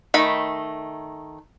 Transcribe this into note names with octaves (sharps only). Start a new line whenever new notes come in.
D#3 A3 B5